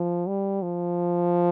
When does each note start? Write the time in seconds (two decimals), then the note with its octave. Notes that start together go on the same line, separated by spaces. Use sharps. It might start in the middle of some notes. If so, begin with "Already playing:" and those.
Already playing: F3
0.28 G3
0.62 F3